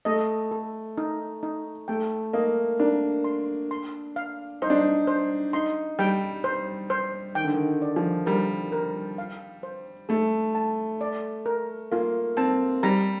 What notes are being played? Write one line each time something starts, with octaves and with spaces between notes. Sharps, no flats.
A3 D#5
A4
D#4
D#4
A3 G5
A#3 D#5
D4 A#4
C6
C6
F5
D#4 C5
D4
D#4
C5
D#4 C6
G3 G5
C5
C5
D#3 G5
D3
D#3
D5
F3
G3 A#4
A#4
F5
C5
A3 A4
A5
D5
A#4
A#3 F4
C4 A5
G3 A#5